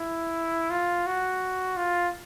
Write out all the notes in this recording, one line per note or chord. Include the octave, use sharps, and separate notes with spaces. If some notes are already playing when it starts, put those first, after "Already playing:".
Already playing: E4
F4
F#4
F4